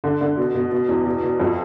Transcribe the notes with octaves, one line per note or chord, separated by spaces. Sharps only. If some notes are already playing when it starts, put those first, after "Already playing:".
D3
D3
B2
B2
B2
E2
B2
B2
F2